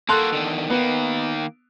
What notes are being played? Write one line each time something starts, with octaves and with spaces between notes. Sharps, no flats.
A#3 F#4 A4 C6 F#6
E2 D3 D#3
D#3 A#3 B3